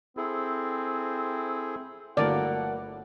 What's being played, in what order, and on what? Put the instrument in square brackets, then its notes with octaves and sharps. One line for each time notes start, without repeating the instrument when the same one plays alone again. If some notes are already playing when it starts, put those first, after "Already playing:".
[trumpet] C4 [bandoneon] E4 G#4 A4
[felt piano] G1 A3 E4 [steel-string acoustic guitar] F3 F#3 A#3 [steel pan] D5 [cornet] F#5